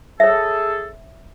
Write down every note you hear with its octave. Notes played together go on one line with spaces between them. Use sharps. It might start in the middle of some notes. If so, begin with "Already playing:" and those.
G#4 A4 C#5 E5